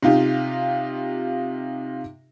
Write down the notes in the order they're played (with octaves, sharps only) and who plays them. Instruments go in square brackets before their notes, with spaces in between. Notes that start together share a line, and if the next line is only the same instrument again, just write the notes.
[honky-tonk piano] C3 D#4 F4 G4